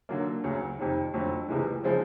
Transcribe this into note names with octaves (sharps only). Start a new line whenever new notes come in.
D3 F#3 A#3
D2 C#3 F#3
F2 C3 D#3
F2 D3 F#3 A3
C#2 C3 E3 G#3
C#3 F3 G#3 C4